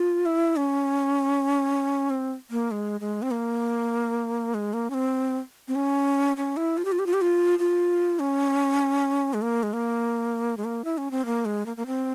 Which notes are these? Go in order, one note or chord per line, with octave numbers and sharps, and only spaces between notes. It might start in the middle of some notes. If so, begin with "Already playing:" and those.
Already playing: F4
E4
C#4
C4
A#3
G#3
G#3
C4
A#3
G#3
A#3
C#4
C4
C4
C#4
C#4
E4
F4
G4
F4
G4
F4
G4
F4
F4
C#4
G#3
A#3
G#3
A#3
G#3
A#3
E4
C#4
C4
A#3
G#3
A#3
A#3
C4